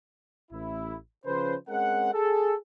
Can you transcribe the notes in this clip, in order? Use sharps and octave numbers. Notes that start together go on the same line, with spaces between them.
A1 E4
C#3 F3 C#4 B4 C5
G#3 C4 C#4 A#4 F#5
G#4 A4